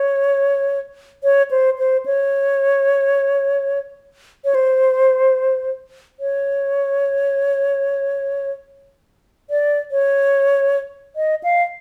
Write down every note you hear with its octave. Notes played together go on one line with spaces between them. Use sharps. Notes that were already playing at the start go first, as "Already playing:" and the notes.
Already playing: C#5
C#5
C5
C5
C#5
C#5
C5
C#5
D5
C#5
D#5
F5